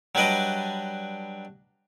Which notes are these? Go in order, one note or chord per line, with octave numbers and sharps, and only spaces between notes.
F#3 G3 D4 B4 D5 D#5